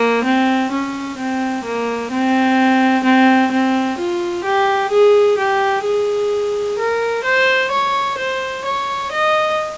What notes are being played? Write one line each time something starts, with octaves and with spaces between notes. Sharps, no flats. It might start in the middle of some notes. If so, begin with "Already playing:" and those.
Already playing: A#3
C4
C#4
C4
A#3
C4
C4
C4
F4
G4
G#4
G4
G#4
A#4
C5
C#5
C5
C#5
D#5